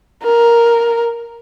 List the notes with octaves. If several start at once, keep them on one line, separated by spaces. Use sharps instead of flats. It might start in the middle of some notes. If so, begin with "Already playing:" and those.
A#4